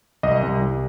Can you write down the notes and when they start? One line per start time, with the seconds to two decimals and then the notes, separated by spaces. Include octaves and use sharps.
0.23 C2 D#5
0.43 C2
0.62 C2